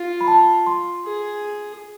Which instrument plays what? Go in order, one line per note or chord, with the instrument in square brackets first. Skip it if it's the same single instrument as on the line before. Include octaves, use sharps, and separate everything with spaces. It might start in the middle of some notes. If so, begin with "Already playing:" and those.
Already playing: [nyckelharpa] F4
[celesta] B5
A5
C6
[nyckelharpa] G#4